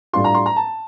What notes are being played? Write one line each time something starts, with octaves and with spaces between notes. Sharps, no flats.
A2 G3 D4 F4 C6
A#5
C6
A#5
A5